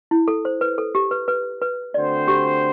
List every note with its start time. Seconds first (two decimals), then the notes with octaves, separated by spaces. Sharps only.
0.11 E4
0.28 A4
0.45 C5
0.61 B4
0.78 A4
0.95 G4
1.11 B4
1.28 B4
1.62 B4
1.94 D3 A3 C4 F#4 C5 D5
2.28 G4